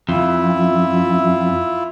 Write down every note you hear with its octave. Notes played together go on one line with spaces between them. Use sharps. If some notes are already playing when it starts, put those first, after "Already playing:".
F2 E4 F4 E5